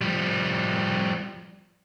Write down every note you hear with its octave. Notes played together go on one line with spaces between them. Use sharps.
F3 G3